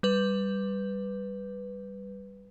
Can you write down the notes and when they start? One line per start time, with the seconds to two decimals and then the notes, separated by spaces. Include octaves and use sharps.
0.03 G3 B4